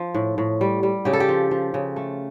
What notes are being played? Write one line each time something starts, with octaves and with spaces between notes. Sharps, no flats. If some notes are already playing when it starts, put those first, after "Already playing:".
Already playing: F3
A2
A2
G3
G3
C#3 G4
A4
G4
F3
F3
C#3
A3